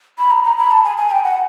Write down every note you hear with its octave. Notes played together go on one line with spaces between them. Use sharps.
B5
A#5
A#5
B5
A5
G#5
G#5
G5
F#5